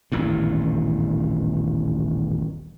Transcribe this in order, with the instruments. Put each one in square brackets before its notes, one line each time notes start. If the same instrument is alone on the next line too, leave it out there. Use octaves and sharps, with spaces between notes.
[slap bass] D#1 A1 E2 G2